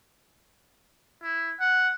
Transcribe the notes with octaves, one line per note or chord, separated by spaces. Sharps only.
E4
F#5